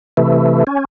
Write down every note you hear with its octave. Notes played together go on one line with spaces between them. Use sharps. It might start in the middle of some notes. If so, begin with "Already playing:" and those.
C3 E3 A3
C#4